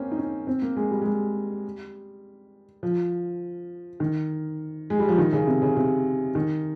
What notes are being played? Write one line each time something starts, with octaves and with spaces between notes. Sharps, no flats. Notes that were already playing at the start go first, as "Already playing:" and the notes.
Already playing: A#3 C4 C#4
D#4
C#4
C4
A#3
G#3
G3
G#3
G3
F3
D#3
G#3
G3
F3
D#3
C#3
C3
C#3
C3
D#3